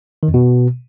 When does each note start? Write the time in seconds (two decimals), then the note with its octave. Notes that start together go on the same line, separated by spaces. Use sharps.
0.23 D#3
0.28 F2
0.34 B2